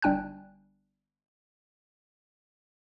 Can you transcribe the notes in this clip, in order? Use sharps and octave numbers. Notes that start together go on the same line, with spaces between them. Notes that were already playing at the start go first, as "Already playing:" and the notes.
G1 G3 D4 G5 G#5 F#6